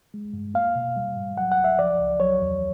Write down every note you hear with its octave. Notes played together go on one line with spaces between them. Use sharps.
G#3
G2
A#3 F5
B2
G3
G#2
F#3 F#5
F#5
C2
E5
F3 D5
C#2
F#3 C#5
E2